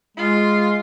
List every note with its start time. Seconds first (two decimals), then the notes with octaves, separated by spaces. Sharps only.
0.17 G#3 F4